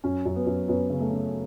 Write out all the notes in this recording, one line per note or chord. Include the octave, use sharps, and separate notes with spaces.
F#2 C#4
F#2
B3
F#2
F#2 B3
C#3
A3
C#3